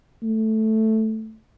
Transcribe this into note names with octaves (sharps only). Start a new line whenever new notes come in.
A3